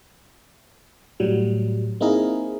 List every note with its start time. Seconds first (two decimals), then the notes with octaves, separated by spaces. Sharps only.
1.20 A2 F#3 G3
2.01 A#3 C4 D#4 E4 G#4 A#4